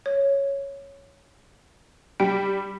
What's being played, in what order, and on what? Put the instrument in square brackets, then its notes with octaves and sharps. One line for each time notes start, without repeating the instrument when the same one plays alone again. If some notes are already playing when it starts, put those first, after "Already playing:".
[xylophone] C#5
[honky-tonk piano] G3 [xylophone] G5